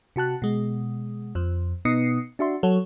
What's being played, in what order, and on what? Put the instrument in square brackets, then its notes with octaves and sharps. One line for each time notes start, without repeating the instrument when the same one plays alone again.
[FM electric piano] C3 F#4 A5 F#6
B2 G#3
F2 F3
B2 B3 D#4 D#6 C7 C#7
D4 F#4 E5 C6
F#3 A4 C#5 F#5